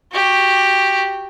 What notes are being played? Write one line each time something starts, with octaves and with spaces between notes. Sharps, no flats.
F#4 G4